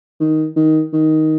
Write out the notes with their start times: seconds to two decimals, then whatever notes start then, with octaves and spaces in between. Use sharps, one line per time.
0.20 D#3
0.56 D#3
0.93 D#3